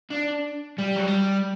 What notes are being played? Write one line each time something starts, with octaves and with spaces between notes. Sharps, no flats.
D4
G3
F#3
G3